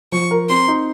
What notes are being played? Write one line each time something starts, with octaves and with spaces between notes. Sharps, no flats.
F3 C#6
A#4
C4 C6
D#4